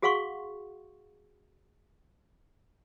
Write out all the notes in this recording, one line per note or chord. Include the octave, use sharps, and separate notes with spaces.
F#4 G#4 F5 F#5 C6 C#6